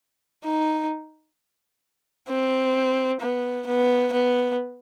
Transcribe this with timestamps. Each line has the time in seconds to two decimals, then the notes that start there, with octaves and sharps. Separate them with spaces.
0.45 D#4
2.29 C4
3.21 B3
3.67 B3
4.12 B3